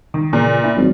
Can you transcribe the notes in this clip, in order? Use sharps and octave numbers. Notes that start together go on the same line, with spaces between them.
D#3
A#2 C#3 E3 A#4
B3 D4 E4
G#1 F#3